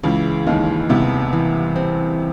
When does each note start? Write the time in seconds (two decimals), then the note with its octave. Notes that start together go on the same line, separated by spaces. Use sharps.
0.03 C#2 C#3 E3
0.47 D#2 D#3 G#3
0.89 C2 C3 B3
1.33 E3
1.76 C4